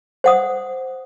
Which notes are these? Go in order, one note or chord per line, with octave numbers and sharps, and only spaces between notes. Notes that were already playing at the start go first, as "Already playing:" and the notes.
C5 F#5 D#6